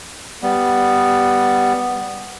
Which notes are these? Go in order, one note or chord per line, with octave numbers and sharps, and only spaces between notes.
G3 B3